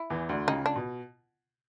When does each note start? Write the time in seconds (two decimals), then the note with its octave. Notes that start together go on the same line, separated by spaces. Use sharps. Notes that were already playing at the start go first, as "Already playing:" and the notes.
Already playing: E4
0.10 E2 E3
0.29 D2 D3
0.47 C#2 C#3 D#4
0.66 D4
0.76 B2